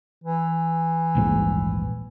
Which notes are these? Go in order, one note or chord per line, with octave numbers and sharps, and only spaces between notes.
E3
D#1 A#1 G#2